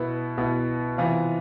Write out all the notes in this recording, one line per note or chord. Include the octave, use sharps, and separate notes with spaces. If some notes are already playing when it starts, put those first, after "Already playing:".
Already playing: B2 B3 E4
B2 B3 E4
C3 E3 B3 F4